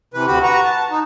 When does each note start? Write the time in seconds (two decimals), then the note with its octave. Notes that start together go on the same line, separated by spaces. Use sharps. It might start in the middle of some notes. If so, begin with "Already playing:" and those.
0.14 C3 E3 B4
0.28 D2 D3 F#4 G4 B5
0.43 F#4 B4 A#5 C#6
0.63 A5
0.90 D#4